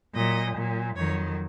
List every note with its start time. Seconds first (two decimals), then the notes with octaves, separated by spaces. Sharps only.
0.14 A#2 F#3 D#5
0.55 A#2 F#3
0.96 F2 D#3 F#3 C#5